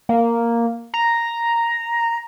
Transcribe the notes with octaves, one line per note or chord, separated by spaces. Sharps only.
A#3
A#5